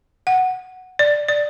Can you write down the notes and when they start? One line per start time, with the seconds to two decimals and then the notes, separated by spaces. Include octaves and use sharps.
0.27 F#5
0.99 D5
1.29 D5